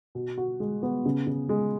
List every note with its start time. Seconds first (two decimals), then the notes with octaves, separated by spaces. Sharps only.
0.15 B2
0.38 F#4
0.60 G#3
0.83 B3
1.06 C#3
1.27 C#3
1.49 G#3